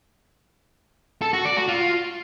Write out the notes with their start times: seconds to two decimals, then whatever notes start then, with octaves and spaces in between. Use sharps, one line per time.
1.22 A4
1.33 F#4
1.45 D5
1.57 F#4
1.68 F4